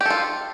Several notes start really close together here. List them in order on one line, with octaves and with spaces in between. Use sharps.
G4 A4 F4